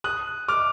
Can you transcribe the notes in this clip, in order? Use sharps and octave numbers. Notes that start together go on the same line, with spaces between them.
D#6 F#6
D6 F6